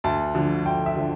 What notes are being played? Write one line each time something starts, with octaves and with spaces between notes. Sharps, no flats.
D2 A5
D3 F3
D2 G5
E5
D3 F3